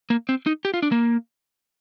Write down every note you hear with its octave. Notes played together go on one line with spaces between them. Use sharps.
A#3
C4
D#4
G4
F4
D4
A#3